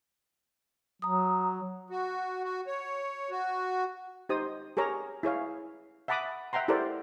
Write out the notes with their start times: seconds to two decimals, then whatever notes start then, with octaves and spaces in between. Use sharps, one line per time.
1.02 F#3 A#5 D#6
1.90 F#4
2.44 F#4
2.67 C#5
3.31 F#4
4.29 D#4 G4 C5 D#6
4.77 G4 G#4 A#4 C#5 A#5
5.23 E4 G#4 C#5 F5
6.08 E5 F#5 A5 B5 D6 D#6
6.53 E5 F#5 G5 A#5 C6
6.68 E4 G4 A4 A#4 C5 D5